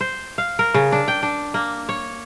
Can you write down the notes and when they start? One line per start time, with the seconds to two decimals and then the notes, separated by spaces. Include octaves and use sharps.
0.01 C5
0.38 F5
0.59 A#4
0.74 C#3
0.92 D4
1.08 G5
1.23 D4
1.54 A#3
1.89 C#5